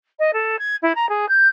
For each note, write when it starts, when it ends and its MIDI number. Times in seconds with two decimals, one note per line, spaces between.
0.19 0.31 75
0.34 0.59 69
0.59 0.76 92
0.82 0.93 64
0.95 1.09 82
1.09 1.28 68
1.29 1.48 91